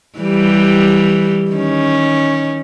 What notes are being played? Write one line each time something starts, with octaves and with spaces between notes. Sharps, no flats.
E3 G3 G4
D#3 C#4